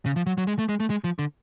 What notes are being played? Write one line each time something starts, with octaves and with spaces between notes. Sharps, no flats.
C#3
F3
F#3
F#3
G#3
A3
G#3
A3
G#3
F3
D3